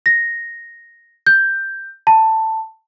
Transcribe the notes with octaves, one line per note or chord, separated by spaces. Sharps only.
A#6
G6
A5